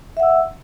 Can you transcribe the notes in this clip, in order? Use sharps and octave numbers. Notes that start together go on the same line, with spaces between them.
E5 F#5 E6